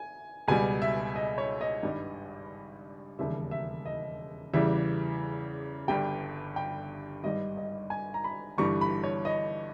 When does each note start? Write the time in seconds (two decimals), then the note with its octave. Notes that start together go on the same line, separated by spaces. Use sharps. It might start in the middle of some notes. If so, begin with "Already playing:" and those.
Already playing: G#5
0.48 C#2 B2 G3 G#5
0.82 E5
1.16 D#5
1.38 C#5
1.61 D#5
1.83 G#1 G2 G3
3.19 E1 D#2 C#3 G3 E5
3.51 E5
3.86 D#5
4.53 E2 C#3 E3 G3 E5
5.88 G1 G2 G3 G5
6.56 G5
7.24 G#1 G2 G3 D#5
7.57 D#5
7.90 G#5
8.14 A#5
8.24 B5
8.58 G1 G2 E3 G3 C#6
8.81 B5
9.03 C#5
9.25 D#5